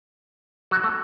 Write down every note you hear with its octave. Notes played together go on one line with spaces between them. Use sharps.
F#3 F#4
A3 A4